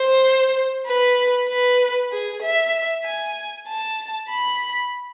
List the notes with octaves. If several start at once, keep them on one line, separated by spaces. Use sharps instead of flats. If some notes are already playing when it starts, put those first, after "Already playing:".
Already playing: C5
B4
B4
G#4
E5
G#5
A5
B5